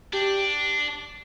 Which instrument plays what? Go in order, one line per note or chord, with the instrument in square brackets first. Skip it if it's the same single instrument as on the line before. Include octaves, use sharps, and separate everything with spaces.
[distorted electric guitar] D4 [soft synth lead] G4